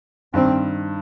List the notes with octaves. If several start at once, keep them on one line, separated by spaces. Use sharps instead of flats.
G2 D#3 G3 C4